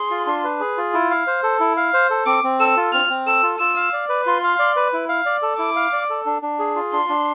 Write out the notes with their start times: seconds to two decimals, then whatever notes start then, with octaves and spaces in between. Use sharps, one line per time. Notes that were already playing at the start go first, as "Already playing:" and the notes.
Already playing: G#4 C6
0.11 F4
0.27 D4
0.44 B4
0.60 G#4
0.78 F4
0.94 E4
1.10 F5
1.27 C5
1.43 A4
1.60 E4
1.77 F5
1.94 C5
2.10 A4
2.26 C4 D6
2.43 C4
2.60 A4 E6
2.77 F4
2.93 C4 F6
3.09 C4
3.26 A4 E6
3.43 F4
3.59 F4 E6
3.76 F5
3.93 D5
4.09 B4
4.26 F4 C6
4.43 F5
4.59 D5
4.76 B4
4.93 E4
5.09 F5
5.26 D5
5.42 A4
5.59 E4 D6
5.76 F5
5.93 D5
6.10 A4
6.26 D4
6.42 D4
6.59 G#4
6.76 F4
6.93 D4 C6
7.09 D4